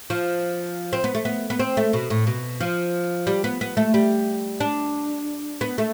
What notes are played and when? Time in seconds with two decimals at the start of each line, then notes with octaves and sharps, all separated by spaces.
0.10 F3
0.93 C4
1.04 B3
1.15 A3
1.25 B3
1.50 B3
1.59 C4
1.77 A3
1.93 B2
2.10 A2
2.27 B2
2.60 F3
3.27 G3
3.44 B3
3.61 B3
3.77 A3
3.94 G3
4.60 D4
5.61 B3
5.78 A3